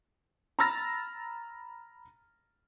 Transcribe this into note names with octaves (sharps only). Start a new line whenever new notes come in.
A#5 B5 E6 F6 A6 A#6